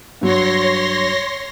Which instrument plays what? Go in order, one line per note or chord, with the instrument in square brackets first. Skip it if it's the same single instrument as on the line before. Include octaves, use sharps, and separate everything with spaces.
[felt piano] G2 F#3 F#4 [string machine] C#5 C6 A#6